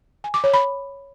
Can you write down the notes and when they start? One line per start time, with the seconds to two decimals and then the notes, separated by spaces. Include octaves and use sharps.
0.24 G#5
0.34 D6
0.44 C#5
0.54 B5